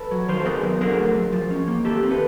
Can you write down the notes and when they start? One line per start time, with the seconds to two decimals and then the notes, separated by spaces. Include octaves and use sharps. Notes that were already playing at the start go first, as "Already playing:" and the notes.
Already playing: A4 B4
0.11 F#3
0.28 D#3 A#4 C5
0.40 A4
0.45 B3 G#4 A#4
0.63 F#3
0.81 D3 G#4 A#4
0.98 A3
1.15 F#3
1.32 F3
1.51 C#4
1.68 A#3
1.84 D#3 G4 A4
2.03 C4
2.11 A4 B4